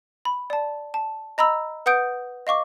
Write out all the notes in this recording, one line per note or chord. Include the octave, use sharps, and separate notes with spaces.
B5
D5 A5
A5
D#5 A#5 B5 E6
B4 F#5 D#6 G6 D7
D#5 F5 C#6 D6